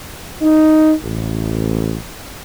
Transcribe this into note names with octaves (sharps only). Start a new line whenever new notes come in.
D#4
A1